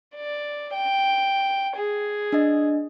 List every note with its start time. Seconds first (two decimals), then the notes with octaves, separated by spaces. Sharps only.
0.15 D5
0.74 G5
1.76 G#4
2.33 D4 D#5